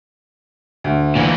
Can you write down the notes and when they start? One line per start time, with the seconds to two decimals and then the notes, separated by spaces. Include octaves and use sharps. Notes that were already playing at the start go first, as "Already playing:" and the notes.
0.84 D2
1.16 A#2 E3